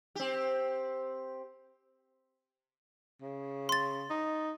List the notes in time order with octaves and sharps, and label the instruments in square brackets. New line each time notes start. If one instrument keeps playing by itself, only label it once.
[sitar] C4 G4
[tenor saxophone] C#3
[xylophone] C6 A6
[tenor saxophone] D#4